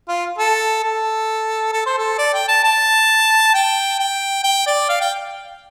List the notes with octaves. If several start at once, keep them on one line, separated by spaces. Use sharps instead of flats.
F4
A4
A4
A4
C5
A4
D5
G5
A5
A5
G5
G5
G5
D5
F5
G5